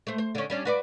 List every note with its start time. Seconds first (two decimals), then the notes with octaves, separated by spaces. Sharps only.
0.07 A3 C5
0.18 C5
0.35 D3 C#4
0.50 G3 C#4 D4
0.65 F#4 B4 D5